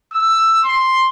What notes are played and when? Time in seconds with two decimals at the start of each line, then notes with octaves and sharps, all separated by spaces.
0.13 E6
0.65 C6